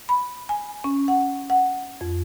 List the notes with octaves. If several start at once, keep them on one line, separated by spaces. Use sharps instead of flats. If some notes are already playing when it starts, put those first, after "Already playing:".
B5
G#5
C#4
F#5
F#5
F2